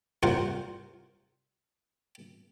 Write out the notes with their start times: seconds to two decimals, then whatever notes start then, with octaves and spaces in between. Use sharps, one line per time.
0.23 C2 A#2 A#4 C5 F#5